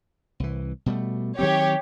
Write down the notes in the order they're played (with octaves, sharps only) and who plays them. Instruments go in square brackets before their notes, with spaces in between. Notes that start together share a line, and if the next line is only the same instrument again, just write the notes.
[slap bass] C2 E3
B2 G3 A3
[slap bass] D#3 F#3 C4 [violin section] G4 C#5